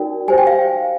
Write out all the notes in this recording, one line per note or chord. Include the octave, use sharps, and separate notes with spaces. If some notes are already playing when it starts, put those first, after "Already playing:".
Already playing: D#4 F#4 A#4 D5 G5
G4 C5 G#5
G5
F5